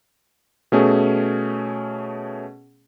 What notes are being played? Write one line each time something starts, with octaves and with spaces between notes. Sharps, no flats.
B2 A3 C#4 G#4